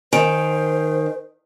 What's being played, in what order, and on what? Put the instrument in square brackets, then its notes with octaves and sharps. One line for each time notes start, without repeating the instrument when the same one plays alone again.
[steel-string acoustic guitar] D#3 [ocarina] C5 [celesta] G5 G#5 D7